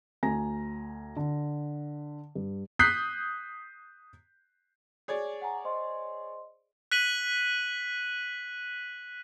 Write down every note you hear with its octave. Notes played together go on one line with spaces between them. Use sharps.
D2 G#5 A#5 A#6
D3
G2
D#6 F#6 G6 B6 C7
G#4 C#5 D5
F#5 G#5 A#5
C5 D#5 C6
F#6 B6 D#7 F#7